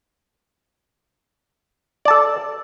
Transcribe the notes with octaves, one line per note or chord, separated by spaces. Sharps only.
A4 D5 A5